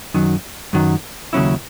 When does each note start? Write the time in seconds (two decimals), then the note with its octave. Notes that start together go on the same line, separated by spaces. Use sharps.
0.14 F#2 D#3 F#3
0.73 F#2 D#3 F#3
1.33 D#2 C#3 F#3 C#4 E4